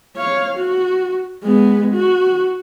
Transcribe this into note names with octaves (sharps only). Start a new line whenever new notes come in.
C#5 F5
F#4
G#3 B3
F#4